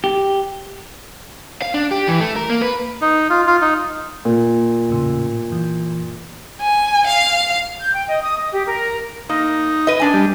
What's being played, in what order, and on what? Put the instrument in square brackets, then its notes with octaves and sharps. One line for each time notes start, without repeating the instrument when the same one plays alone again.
[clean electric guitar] G4
[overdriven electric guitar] F5
D4
G4
E3
A3
A#4
A#3
B4
[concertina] D#4
F4
F4
D#4
[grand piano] A#2
[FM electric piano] E2 A2 C#3
F#2 E3
[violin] G#5
F5
[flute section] G6
G5
D#5
D#6
D#5
G4
A#4
[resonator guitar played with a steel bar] A#3 [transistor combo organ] D#4
[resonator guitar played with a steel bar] B4 D#5
A#2 D4 G#5
[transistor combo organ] G3